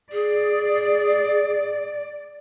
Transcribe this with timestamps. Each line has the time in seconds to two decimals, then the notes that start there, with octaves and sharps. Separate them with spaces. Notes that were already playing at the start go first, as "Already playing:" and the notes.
0.12 G#4 D5